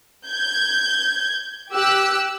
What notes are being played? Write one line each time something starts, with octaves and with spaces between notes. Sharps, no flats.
G6 G#6
G4 E6 F#6